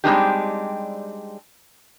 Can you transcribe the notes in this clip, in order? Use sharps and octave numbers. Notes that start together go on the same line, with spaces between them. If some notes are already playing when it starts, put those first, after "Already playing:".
G3 G#3 C4 D4 D#4 G4